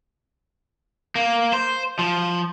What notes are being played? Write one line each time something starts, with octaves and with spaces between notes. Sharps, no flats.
A#3
C5
F3